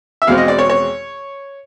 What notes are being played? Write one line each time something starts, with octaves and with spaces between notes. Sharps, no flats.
E5
E2 B2 G#3 C4 F5
D#5
D5
C#5
C#5